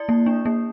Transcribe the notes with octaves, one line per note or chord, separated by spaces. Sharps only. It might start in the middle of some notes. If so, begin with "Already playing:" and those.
Already playing: E4 D5
A#3
D4
A#3